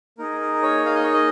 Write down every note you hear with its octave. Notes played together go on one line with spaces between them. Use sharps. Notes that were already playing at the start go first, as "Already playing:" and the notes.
A#3 D#4 G#4 A#4
A#4
C#5
F5
D#5
C#5
D#5